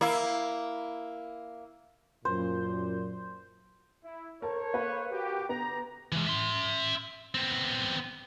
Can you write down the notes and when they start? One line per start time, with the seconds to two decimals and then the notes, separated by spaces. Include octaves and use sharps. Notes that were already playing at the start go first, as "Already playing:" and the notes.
0.01 A#3 E4
2.25 F#2 A#2 C5
4.04 E4
4.42 A4 A#4 C5 C#5 A5
4.73 A#3 B4 F5
5.11 F#4 G4
5.49 D3 B3 G4 A#5
6.12 E3 G#3
6.27 E5 C6
7.35 B3 C4